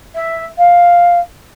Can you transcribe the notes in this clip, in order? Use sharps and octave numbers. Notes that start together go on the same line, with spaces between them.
E5
F5